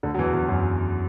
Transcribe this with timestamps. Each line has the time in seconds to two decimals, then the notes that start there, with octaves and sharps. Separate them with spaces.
0.03 D2 D3
0.14 F#3
0.18 E2 E3
0.33 E2 E3
0.48 F#2 F#3